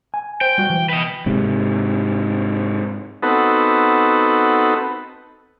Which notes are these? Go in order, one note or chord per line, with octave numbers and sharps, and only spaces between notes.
G#5
C5 G5
G3 F#4
E3
B4 D#5
G#2 C3
B3 C4 D#4 F#4 A4 B4